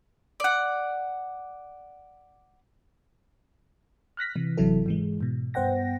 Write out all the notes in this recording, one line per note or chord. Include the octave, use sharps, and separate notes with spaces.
D5 F#5
F6 F#6 A#6 B6
C3 E3
G1 C3 E3 F#3 E4 A4
G#2 E3 G#3
G#2 B2
G2 B3 C5 F#5 G5 A#6